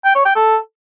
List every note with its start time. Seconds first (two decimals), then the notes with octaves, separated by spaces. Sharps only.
0.05 G5
0.15 C#5
0.25 G5
0.36 A4